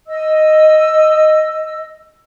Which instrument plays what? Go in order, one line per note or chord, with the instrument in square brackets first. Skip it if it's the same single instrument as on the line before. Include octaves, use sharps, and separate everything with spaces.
[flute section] D#5 E6